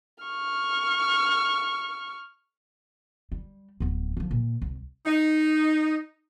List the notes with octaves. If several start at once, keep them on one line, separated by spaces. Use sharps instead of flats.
C#6 F6
G3
D1 B3
D3 F3
A#2
C2
D#4